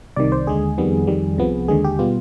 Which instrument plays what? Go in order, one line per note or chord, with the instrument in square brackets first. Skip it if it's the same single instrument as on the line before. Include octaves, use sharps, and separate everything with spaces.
[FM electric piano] C2 C3 D#3 D5
C5
D#2 D3 G#3 G#4
F2 D#3 G3 B3
F2 D#3 G3
C2 C3 F3 B3
D#2 D3 G#3 G#4
G4
B2 G3 B3 F4